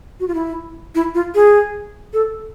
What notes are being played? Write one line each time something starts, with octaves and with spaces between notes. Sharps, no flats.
F#4
F4
E4
E4
F4
G#4
A4